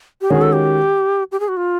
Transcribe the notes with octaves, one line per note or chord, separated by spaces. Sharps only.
G4
D#3 G#3 C#4 F#4 G#4
A4
G4
G4
G#4
F#4
F4